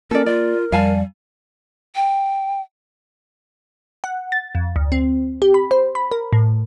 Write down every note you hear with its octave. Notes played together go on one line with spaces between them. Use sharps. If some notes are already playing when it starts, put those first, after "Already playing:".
A#3 C#4 A4 A#4 D5
F4 D5
F2 G3 F5 G#5 A5
G5
F#5
A6
F2
D2
C4
G4
B5
C5
B5
A#4
A2